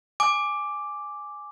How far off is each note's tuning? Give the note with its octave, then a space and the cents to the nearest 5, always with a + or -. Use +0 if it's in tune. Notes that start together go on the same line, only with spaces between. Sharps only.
G#5 +0 D6 +0